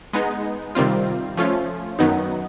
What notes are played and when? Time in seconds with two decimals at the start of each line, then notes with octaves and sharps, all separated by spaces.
0.13 G#3 B3 D#4
0.75 C3 D#3 G3 C4 F4
1.37 F3 A3 C#4 F4
1.99 F#2 D#3 F#3 B3 D#4